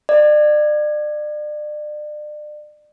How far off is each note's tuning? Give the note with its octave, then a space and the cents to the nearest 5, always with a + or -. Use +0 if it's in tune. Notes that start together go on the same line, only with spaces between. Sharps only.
D5 +35